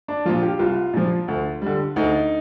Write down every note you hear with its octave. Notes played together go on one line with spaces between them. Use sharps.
D4
A#2 F3 F4
G4
C2 F4
A#2 F3
D2
D3 G3
D2 D#4